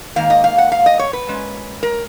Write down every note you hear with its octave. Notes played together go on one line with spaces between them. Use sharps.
G#2 D#3 A#3 F5
D#5
F5
F#5
F5
D#5
C#5
B4
A#2 G#3 C#4
A#4